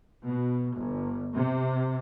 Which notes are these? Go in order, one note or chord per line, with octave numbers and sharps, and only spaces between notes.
B2
G1
C3